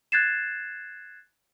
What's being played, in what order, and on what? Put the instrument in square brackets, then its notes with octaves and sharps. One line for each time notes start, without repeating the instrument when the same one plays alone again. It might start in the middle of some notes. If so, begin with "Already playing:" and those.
[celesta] F#6 G#6 A6 C7 E7